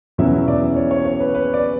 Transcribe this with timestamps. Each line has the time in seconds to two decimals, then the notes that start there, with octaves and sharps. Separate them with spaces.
0.18 E2 B2 F#3 C#4 E4 E5
0.48 D5
0.76 C#5
0.91 C#5
1.06 C#5
1.20 B4
1.35 B4
1.54 D5